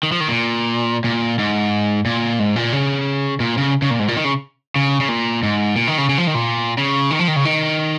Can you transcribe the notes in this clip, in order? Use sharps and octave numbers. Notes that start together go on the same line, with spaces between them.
D#3
F3
D#3
A#2
A#2
G#2
A#2
G#2
A#2
C#3
A#2
C#3
C#3
A#2
G#2
A#2
D#3
C#3
C#3
C#3
A#2
G#2
A#2
D#3
C#3
C#3
F3
D#3
A#2
C#3
D#3
F3
D#3
C#3
D#3